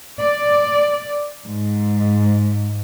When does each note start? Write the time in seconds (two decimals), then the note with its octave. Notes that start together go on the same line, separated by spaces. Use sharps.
0.20 D5
1.45 G#2